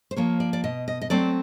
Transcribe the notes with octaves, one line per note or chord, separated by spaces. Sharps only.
C5
F3 A#3 C#5
D5
D5
B2 D#5
D#5
D#5
F#3 A3 C4 D5